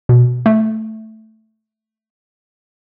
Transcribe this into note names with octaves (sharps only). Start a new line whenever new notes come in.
B2
A3